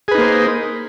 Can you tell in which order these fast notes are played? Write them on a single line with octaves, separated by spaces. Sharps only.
G#4 B4 D#4 A#3 C5